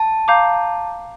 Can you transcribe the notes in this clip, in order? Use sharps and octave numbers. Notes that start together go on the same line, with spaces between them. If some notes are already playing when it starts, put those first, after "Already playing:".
Already playing: A5
F5 A#5 D6 G6